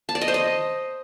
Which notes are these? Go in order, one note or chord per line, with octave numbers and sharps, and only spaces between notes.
A5
D5
D#5
C5
D#5